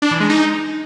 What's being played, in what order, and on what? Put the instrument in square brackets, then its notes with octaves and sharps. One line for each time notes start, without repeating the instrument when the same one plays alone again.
[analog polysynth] D4
E3
G#3
D#4